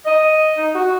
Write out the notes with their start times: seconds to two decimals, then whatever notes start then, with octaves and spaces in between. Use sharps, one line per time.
0.04 D#5
0.56 D#4
0.73 F#4